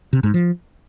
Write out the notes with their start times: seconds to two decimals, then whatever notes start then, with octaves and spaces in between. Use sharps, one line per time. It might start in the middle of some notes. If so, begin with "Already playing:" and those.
0.13 C3
0.23 G#2
0.34 F3